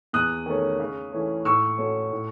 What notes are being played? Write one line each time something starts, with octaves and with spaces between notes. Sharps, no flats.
E2 D#6 F#6
D#3 A3 C#4
C#3
E3 A3 C#4
A2 C#6 E6
F#3 A3 C#4
A2